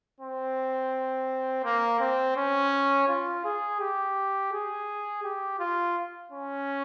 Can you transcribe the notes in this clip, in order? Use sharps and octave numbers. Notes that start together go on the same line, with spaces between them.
C4
A#3
C4
C#4
F4
G#4
G4
G#4
G4
F4
C#4